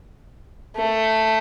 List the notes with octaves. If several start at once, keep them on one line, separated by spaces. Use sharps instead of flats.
A3